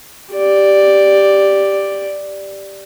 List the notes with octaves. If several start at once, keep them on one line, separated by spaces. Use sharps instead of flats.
G4 D5